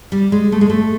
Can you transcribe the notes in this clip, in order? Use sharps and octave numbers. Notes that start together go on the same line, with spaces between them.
G3
G#3
A3
G#3
A3